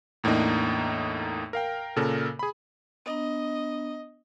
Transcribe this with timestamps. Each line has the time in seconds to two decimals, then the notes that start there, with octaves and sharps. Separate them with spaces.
0.24 E2 A2 A#3 D4 D#4
1.53 A#4 F5 G5
1.96 A#2 C#3 A4 A#4
2.39 G#4 B5
3.06 B3 D4 D#5 A#5